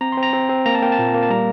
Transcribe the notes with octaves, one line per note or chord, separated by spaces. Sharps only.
C4 A#5
C6
C4
A#5
C4
C4
A#3 A#5
A5
A#3 G5
A5
A#2
A#3
A5
G3 A#5